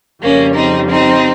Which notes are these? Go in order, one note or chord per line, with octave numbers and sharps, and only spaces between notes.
F2 C#3 G3 A#3 C#4
C4 D#4
C4 D#4